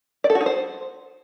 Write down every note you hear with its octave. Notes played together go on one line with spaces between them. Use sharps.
D5
A4
F#4
D#4
C5